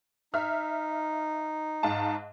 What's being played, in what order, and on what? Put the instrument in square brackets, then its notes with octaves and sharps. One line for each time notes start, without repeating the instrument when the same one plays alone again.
[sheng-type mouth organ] D#4 [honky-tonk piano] E5 F6
[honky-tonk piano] G#2 F5 A5